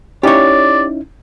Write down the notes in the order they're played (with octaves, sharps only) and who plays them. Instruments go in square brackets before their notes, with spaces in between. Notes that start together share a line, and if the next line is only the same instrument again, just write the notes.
[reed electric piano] C#4 D#4 E4 [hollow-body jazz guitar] G4 C#5 [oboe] D5